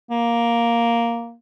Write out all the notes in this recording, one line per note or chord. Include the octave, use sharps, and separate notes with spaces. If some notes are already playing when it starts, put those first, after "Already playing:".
A#3